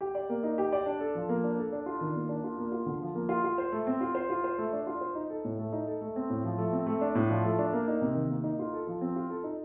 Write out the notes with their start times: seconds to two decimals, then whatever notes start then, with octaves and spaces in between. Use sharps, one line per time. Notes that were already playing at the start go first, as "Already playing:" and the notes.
0.01 G4
0.15 D5
0.29 A#3
0.43 D#4
0.58 G4
0.73 D5
0.86 D4
1.00 A4
1.15 F3
1.29 A#3
1.44 D4
1.58 A4
1.72 D4
1.86 F4
2.01 D#3
2.15 A#3
2.29 D4
2.44 F4
2.58 A#3
2.72 F4
2.86 D3
3.01 F3
3.15 A#3
3.29 F4
3.44 F4
3.58 C5
3.72 A3
3.87 C4
4.01 F4
4.15 C5
4.30 F4
4.44 C5
4.58 A3
4.73 D4
4.87 F4
5.01 C5
5.15 D#4
5.30 A4
5.45 A2
5.59 A3
5.73 D#4
5.88 A4
6.01 A3
6.16 C4
6.30 A2
6.44 F3
6.58 A3
6.73 C4
6.86 A3
7.01 D4
7.15 A2
7.30 F3
7.44 A3
7.59 D4
7.73 A#3
7.88 D#4
8.01 C3
8.15 D#3
8.30 A#3
8.44 D#4
8.59 F4
8.73 A4
8.87 F3
9.01 C4
9.16 F4
9.30 A4
9.44 D#4